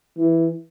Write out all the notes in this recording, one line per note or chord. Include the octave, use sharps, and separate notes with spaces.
E3